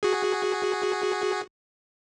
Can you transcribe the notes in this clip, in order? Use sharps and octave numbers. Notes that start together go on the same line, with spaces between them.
F#4 G#4